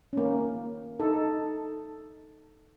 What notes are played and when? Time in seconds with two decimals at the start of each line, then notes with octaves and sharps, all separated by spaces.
0.13 A#3 C#4
1.00 D#4 A4